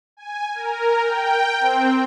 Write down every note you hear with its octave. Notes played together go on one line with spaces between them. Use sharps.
G#5
A#4
G5
C4